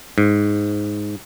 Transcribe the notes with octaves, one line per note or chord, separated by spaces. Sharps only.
G#2